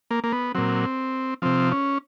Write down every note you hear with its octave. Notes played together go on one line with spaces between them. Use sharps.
A#3
A#3
B3
A#2 F#3 C4
C3 F3 C4
C#4